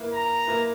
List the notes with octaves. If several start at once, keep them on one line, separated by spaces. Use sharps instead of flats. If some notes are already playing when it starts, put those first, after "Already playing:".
Already playing: A#3 E4 B4
A#5
A#3 E4 B4